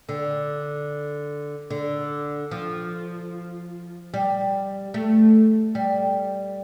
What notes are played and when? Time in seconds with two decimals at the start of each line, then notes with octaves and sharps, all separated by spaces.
0.09 D3
1.71 D3
2.51 F3
4.14 G3
4.94 A3
5.75 G3